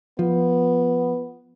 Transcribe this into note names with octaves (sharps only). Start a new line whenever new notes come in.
F3 B3